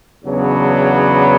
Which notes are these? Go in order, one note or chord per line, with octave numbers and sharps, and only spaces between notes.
E2 C#3 F#3 B3 D4